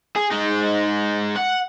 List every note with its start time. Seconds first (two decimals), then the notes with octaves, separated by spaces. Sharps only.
0.16 G#4
0.31 G#3 D#4
1.36 F#5